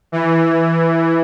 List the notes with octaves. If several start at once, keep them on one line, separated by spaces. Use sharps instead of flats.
E3